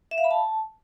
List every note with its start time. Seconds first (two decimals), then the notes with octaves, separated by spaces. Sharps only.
0.11 E5
0.18 F5
0.24 B5
0.31 A5